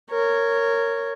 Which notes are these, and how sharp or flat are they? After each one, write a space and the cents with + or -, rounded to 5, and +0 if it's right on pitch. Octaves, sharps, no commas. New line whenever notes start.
A#4 -15 C#5 +0